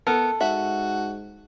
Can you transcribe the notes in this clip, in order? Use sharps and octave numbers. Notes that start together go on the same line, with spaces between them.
B3 A4 A#4
G#2 F#4 E5